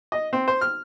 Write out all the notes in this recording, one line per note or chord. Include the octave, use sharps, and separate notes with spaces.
D#5
C4
C5
F6